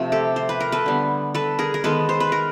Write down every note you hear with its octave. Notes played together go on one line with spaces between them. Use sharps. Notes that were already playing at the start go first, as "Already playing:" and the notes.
Already playing: C3 F3 A3
G4 A4
C5
B4
A#4
A4 B4
D3 G3 B3
A4 B4
G#4 A#4
A#4
D#3 G#3 B3 A4 B4
C5
B4
A#4